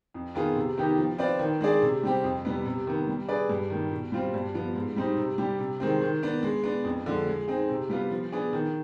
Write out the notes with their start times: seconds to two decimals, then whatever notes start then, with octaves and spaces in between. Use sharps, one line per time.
0.14 F2
0.35 D#3 B3 F4 G#4
0.56 C3
0.77 D#3 B3 D#4 G4
0.97 F3
1.18 C4 F4 B4 D5
1.39 D#3
1.61 G#3 D4 G#4 D5
1.82 C3
2.03 G3 C4 G4
2.24 F2
2.45 C3 G3 B3
2.66 C3
2.87 D#3 B3
3.07 G3
3.28 D4 G#4 B4 D5
3.49 G2
3.70 D#3
3.75 G3
3.92 B2
4.12 G3 C4 F4
4.34 G2
4.54 F3 B3
4.75 G#2
4.96 G3 C4 D#4
5.17 C3
5.38 G3 D4 G4
5.59 C3
5.80 D#3 G#3 C4
6.01 D#3
6.23 B3 D4
6.43 G#3
6.64 B3 D4
6.84 F2
7.06 D3 F3 G#3
7.27 G#3
7.48 C4 D#4 G#4
7.69 C3
7.89 G3 B3 F4
8.11 F3
8.32 B3 D4 G#4
8.53 D#3